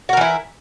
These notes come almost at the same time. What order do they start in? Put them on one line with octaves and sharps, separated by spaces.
F#4 A#4 E3 E4